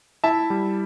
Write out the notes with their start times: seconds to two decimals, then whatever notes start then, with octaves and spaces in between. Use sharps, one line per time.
0.24 E4 E5 A5
0.50 G3